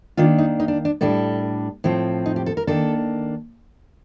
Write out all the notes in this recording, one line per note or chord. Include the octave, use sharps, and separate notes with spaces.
D#3 A#3 D4 F4
D#4
D#4
D4
D4
A2 G3 D4 A4
A2 F3 C4
D#4
G4
A4
A#4
D#3 A#3 D4 A4